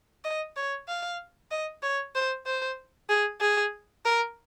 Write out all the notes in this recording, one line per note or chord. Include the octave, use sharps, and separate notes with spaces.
D#5
C#5
F5
D#5
C#5
C5
C5
G#4
G#4
A#4